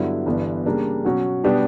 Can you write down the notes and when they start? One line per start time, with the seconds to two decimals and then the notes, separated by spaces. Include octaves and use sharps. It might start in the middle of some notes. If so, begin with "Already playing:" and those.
Already playing: G2 D3 F#3 B3 E4
0.26 G1 G2 E3 B3
0.66 C#3 G3 A#3 D4
1.05 B2 F#3 C#4 F#4
1.44 B2 G3 B3 D4 G4